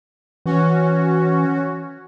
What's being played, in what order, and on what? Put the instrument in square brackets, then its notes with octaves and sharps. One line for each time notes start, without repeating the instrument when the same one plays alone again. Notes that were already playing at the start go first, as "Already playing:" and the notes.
[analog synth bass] E3 [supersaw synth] C#4 F#4